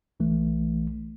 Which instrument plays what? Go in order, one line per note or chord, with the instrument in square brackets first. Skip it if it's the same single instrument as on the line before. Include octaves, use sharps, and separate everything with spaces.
[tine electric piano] B1 E3 A3